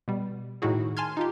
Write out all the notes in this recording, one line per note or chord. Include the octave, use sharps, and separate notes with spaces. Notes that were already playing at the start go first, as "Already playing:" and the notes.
B2 G3
A2 D#3 D#4 E4 F#4 G#4
G#5 A5 C6 F6 G#6
D#4 F4 G4